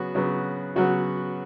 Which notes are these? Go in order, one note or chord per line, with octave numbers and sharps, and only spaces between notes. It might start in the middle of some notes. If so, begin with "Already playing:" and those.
Already playing: C#3 F#3 B3 F#4
C#3 F#3 B3
C#3 F#3 B3 F#4